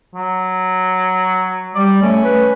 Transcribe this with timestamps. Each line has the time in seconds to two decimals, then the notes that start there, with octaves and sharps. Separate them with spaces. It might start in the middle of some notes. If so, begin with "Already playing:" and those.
0.15 F#3
1.75 G3 D5
2.02 A3 C#4
2.24 B4